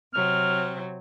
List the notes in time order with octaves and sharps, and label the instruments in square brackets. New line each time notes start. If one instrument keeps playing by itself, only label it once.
[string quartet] C3 F#3 C4 [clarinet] F6